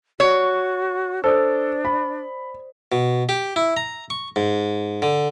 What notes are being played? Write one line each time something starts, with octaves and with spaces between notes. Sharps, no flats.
F#4 C#5
D4 A4 C5 D5 D#6
B5
B2
G4
E4
A#5
C#6
G#2
D3